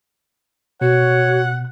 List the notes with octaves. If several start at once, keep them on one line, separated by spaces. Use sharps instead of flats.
B2 F#4 C#5 F#5